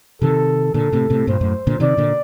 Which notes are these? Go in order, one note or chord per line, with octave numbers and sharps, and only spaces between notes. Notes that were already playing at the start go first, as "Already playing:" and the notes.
C3 D#3 A4
A#2 D3 A4
A2 C3
A2 C3
G2 A#2 C5
F#2 A2
A#2 D3
C3 D#3 D5
A#2 D3